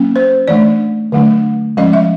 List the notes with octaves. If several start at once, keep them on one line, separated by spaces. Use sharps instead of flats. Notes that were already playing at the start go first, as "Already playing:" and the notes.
Already playing: F#3 A#3 C#4
C5
E3 A3 D4 D5
D3 F#3 A3 D4
F3 G#3 C#4 D#5
E5